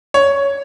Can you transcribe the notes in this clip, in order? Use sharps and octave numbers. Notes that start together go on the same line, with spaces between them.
C#5